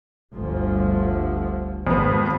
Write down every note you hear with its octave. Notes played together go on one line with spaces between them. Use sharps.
G1 D2 F3
G#1 F2 B3